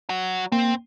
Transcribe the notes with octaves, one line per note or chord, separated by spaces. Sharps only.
F#3 F#4
A#3 C4